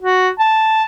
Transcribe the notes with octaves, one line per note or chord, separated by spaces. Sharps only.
F#4
A5